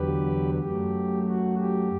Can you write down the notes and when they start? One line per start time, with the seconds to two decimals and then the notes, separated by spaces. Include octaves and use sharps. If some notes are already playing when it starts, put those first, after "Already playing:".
Already playing: E2 D3 F#3 G4 B4
0.60 F#2 F#3 A3 G4
1.26 F#4
1.58 G4